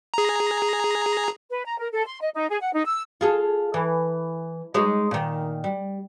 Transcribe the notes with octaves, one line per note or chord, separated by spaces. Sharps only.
G#4 A#5
B4
A#5
A#4
A4
C6
D#5
D#4
G#4
F#5
D#4
E6
F4 G#4 A4
E3
G#3 D#4 C#5
A#2 D#3
G3